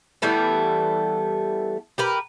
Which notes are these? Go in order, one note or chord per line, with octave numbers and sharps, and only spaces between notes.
E3 G3 A3 B3
G4 A#4 B4